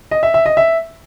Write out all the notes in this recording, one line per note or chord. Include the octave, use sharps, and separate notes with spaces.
D#5
E5
E5
D#5
E5